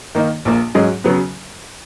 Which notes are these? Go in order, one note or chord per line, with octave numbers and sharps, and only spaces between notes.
D#3 A#3 D#4
A#1 A#2 A#3
G#2 F#3 C#4 G#4 D#5
C#3 F#3 B3